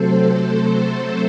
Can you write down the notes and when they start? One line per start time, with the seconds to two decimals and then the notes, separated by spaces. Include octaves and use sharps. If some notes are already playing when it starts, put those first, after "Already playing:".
Already playing: C3 F#3 A3 C4 A4 C5
0.18 A4 C5
0.48 A4 C5